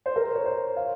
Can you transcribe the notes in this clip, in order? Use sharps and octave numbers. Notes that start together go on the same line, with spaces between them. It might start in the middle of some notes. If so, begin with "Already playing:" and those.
C5
A#4
C#5
C5
F5